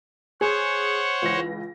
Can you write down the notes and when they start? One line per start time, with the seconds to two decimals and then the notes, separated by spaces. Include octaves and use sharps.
0.41 G#4 C5 C#5 F#5
1.22 C#2 E3 A#6